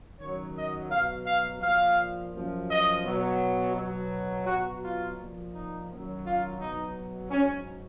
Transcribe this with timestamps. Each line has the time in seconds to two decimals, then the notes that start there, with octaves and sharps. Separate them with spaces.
0.19 F#2 D#3 F#3 C#5
0.55 D#5
0.90 B2 F#3 F5
1.26 F5
1.61 A#2 F3 F5
2.33 F#2 F3
2.68 D#5
3.04 B2 F#3
3.75 B2 F#3
4.46 B2 F#3 F#4
4.82 F4
5.18 A#2 F3
5.54 D#4
5.89 F#2 D#3 F#3
6.25 F4
6.59 B2 F#3 D#4
7.31 G#2 F#3 C#4